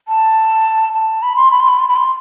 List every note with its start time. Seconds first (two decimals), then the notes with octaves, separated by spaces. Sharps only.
0.08 A5
0.93 A5
1.22 B5
1.36 C6
1.51 B5
1.60 C6
1.68 B5
1.79 C6
1.88 B5
1.96 C6